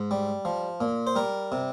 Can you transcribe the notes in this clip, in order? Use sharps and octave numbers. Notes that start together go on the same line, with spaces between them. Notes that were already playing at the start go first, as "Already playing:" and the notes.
Already playing: G#2
G3
F3
A#2
C5
G3 A#4
C3